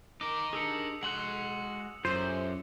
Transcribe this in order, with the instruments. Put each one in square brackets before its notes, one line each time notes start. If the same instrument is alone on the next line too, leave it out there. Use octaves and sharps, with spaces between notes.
[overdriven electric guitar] D#4 A#4 [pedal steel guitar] D6
[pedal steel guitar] D4 G4 G#4 [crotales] D#6 E6 C#7
[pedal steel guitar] G#3 F#4 F#6 [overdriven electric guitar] F#5 C6 [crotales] F#7
[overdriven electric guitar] F#2 [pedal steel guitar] F4 G4 A4 [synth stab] C5